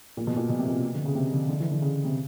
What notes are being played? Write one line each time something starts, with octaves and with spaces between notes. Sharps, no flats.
A#2
B2
A#2
B2
C3
B2
D3
C#3
C3
D3
D3
E3
D3
C#3
C3